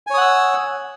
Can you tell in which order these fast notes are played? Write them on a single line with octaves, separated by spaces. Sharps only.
G#5 C#5 D#6 F#5 E6